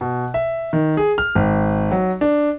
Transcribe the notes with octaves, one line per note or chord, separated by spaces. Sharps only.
B2
E5
D#3
G#4
F6
G#1
F#3
D4